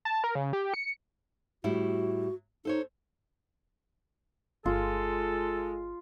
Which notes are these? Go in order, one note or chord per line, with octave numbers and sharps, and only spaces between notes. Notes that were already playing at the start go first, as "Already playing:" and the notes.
A5
A#4
C#3
G4
C#7
A2 G3 E4 F#4
D#4 A4 C5 C#5
G1 G#3 F4 A4